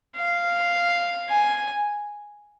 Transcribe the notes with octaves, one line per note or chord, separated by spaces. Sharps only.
F5
G#5